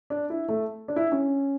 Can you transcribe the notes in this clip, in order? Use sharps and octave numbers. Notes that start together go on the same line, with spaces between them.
D4
E4
A3
D4
E4
C#4